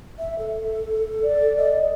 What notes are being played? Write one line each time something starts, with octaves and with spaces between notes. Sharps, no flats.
E5
A4
D5
D#5